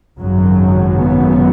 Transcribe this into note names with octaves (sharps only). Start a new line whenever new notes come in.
G#1 F#2 C#3 F#3
B3